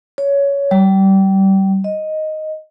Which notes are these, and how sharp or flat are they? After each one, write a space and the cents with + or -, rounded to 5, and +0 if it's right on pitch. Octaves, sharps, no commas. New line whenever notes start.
C#5 +15
G3 -25
D#5 +0